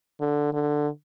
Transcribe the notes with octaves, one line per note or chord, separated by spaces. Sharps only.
D3
D3